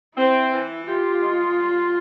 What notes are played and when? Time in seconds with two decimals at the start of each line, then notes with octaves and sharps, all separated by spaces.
0.17 C4 E4
0.52 E3
0.86 F4 G4
1.21 G#3
1.56 G3